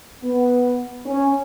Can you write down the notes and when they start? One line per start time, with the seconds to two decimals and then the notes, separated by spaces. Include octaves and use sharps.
0.24 B3
1.06 C#4